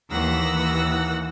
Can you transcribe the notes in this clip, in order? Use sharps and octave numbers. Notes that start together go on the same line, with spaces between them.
D#2 E3 F#5 E6 A#6